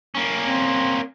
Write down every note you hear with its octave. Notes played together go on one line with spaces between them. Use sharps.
A#3 C#4
C4